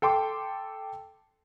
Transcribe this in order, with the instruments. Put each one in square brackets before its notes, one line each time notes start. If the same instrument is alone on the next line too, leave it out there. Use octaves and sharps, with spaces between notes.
[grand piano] A4 G5 C6 D6